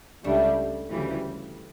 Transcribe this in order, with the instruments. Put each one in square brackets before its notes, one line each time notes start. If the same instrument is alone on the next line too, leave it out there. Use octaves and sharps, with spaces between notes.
[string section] C#2 C#3 G3 D4 [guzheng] A3
[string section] D2 C#3 E3 G3